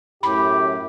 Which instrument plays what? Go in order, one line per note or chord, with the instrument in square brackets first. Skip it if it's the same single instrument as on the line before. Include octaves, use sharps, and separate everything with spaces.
[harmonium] F#2 A2 [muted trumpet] G4 [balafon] B5